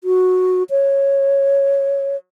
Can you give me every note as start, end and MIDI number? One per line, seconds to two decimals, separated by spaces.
0.04 0.63 66
0.70 2.16 73